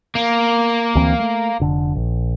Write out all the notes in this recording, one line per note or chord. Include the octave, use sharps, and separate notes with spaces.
A#3
D2 E3 C4
A3
F1 D3
A#1